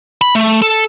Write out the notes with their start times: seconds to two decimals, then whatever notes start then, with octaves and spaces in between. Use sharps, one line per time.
0.21 B5
0.35 A3
0.62 A4